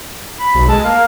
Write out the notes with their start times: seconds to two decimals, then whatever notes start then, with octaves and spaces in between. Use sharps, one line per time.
0.40 B5
0.55 B1
0.68 G#3 A5
0.85 A#3 F5